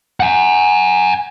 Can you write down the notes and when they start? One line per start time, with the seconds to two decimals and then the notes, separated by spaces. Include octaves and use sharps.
0.20 F#5 G#5